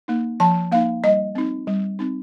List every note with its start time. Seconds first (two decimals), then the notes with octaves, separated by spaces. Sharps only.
0.08 A#3 D#4
0.40 F3 A5
0.72 A#3 D#4 F5
1.04 G3 D#5
1.35 C4 D#4
1.67 G3
1.99 C4 D#4